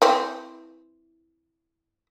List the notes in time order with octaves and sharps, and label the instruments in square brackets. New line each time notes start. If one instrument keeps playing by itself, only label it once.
[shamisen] E3 C4